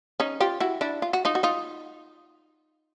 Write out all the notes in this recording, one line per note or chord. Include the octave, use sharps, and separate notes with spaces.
C#4 D#4
F4 G4
E4 F#4
D4 E4
F4
F#4
D#4 F4
F#4
D#4 F4